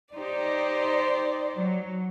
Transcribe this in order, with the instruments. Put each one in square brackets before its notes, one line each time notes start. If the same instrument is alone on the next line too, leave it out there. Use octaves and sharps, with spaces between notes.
[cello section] D#4 G4 [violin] C5 D5
[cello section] F#3